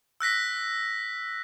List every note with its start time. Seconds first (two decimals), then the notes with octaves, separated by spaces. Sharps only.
0.21 E6 F#6 A#6 B6